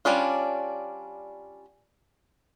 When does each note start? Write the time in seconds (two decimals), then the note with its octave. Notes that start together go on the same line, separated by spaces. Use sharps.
0.05 G3 C#4 D4 F4